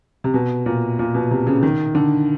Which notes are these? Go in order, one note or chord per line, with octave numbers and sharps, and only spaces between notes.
C3
B2
A#2
A#2
B2
C3
C#3
D#3
D3